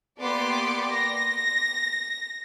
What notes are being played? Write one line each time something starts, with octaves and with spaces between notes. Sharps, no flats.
A#3 B3 G4 D5 C6 D6
A#6